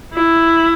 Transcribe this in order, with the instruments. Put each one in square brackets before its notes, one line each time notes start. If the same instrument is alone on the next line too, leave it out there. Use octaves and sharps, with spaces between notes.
[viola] E4